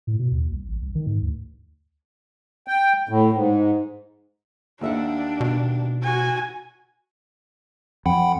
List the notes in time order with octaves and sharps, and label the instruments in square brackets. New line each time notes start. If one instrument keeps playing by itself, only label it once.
[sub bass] A2
B2
D#2
C2
A1
C2
D#3
G#2
D2
[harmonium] G5
A2
G#2
[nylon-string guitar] D#2 E5 F#5 [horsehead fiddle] D4
[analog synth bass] B2
[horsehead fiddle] F#4 G#5
[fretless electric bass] F2 [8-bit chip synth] F#5 G5 B5